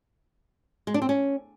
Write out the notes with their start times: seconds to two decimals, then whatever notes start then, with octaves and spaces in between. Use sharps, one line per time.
0.87 G#3
0.94 D4
1.02 C4
1.09 C#4